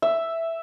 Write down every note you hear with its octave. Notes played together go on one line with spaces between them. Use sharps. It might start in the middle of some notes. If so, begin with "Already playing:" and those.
E5